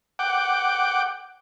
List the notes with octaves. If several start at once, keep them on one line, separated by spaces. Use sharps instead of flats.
F#5 G5 D6